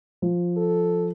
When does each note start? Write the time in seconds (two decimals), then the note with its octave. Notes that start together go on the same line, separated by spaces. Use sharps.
0.22 F3
0.57 A4